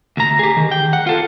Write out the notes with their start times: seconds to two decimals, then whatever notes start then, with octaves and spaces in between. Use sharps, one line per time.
0.17 D2 A#5
0.39 G4 G#4
0.57 D#3
0.72 G5
0.93 F#5
1.07 F4 A4